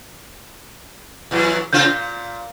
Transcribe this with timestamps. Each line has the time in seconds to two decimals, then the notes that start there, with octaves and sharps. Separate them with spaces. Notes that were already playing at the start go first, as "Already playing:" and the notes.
1.31 E2 E3 F#3
1.73 C#3 C4 F4 G6
1.85 A#2